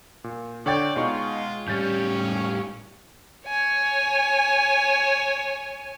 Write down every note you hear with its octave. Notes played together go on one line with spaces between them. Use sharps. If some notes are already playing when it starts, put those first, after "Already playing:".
A#2
D3 C#5 D5 G5 G6
B2 G#3 D#4 F4 C#6
A2 G3 C#4 G4 G6 A6
C#5 G#5